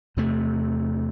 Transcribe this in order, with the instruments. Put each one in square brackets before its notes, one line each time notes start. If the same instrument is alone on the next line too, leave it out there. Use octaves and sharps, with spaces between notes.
[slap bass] E2 C3 A3